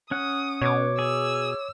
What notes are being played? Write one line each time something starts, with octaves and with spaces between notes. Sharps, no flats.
C#4 F#5 D#6
B2 C#5 D6
G#4 E6